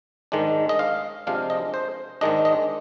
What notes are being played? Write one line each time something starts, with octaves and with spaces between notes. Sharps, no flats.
G#2 D#3 G#3 D4
D#5
F5
C3 F3 G#3 D4 F5
D#5
C5
G#2 D#3 G#3 D4 D#5
D#5